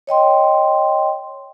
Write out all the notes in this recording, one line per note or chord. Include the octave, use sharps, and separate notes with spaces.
C#5 D#5 G5 C6